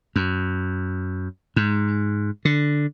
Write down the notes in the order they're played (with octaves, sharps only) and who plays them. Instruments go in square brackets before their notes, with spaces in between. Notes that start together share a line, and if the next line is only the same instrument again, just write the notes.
[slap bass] F#2
G#2
D3